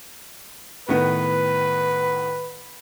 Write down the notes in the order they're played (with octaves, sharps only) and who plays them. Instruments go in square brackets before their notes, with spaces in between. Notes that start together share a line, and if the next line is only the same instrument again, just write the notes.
[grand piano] A2 D#3 B3 [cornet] B4